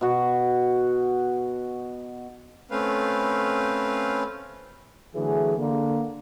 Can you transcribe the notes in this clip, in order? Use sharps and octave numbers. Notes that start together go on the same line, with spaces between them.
B2 F#4
A3 C4 C#4 B4 F5
D3 E3 F#3 A3 G#4
D3 A#3